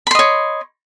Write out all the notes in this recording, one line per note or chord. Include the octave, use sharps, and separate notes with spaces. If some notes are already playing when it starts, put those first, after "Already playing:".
C#5 D#5 B5 C6